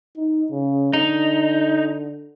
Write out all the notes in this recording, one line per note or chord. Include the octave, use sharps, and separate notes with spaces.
D#4
C#3
D3 D#4